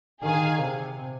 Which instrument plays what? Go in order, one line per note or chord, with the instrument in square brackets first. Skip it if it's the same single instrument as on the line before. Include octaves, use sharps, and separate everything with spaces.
[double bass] D#3 [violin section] G#4 F5 G#5
[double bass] C3